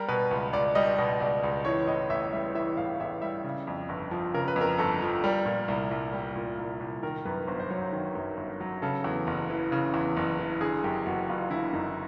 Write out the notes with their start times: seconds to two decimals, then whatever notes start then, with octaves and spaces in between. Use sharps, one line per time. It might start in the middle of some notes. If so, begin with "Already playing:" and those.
Already playing: G3 A#4
0.09 B2 B4
0.31 C#2
0.53 C#2 D5
0.75 G3 D#5
0.98 B2
1.20 C#2 D5
1.44 C#2
1.65 E3 C#5
1.87 A2 D#5
2.10 A1 E5
2.33 G3 E5
2.55 E3 E5
2.77 A2 F5
3.00 A1 E5
3.22 G3 E5
3.44 C#3
3.67 F2
3.89 G1
4.11 F3
4.34 C#3 A#4
4.48 B4
4.56 F2 A#4
4.78 G1 A4
5.02 F3
5.24 G3 A#4
5.46 A#2
5.68 C2
5.91 C2
6.13 G3
6.36 A#2
6.58 C2
6.80 C2
7.03 D#3 A#4
7.25 F#2 B4
7.47 G1 C5
7.60 C5
7.70 F#3 C#5
7.92 D#3
8.15 F#2
8.37 G1
8.60 F#3
8.82 C#3 A4
9.04 E2
9.27 F#1
9.50 E3
9.72 C#3
9.94 E2
10.17 F#1
10.39 E3
10.61 D3 G#4
10.84 F#2 G4
11.06 F#1 F#4
11.29 F#1 F4
11.50 D3 E4
11.73 F#2 D#4